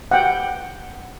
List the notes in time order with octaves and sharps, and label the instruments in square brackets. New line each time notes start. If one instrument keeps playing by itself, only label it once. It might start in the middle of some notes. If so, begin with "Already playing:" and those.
[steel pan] F#5 G5